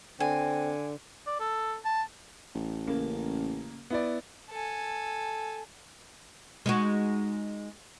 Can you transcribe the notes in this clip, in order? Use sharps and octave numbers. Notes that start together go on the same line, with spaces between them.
D3 C4 G#5
D5
A4
A5
A1
C#3 A#3
B3 E4 D5
A4 G#5
G#3 D#4 F#4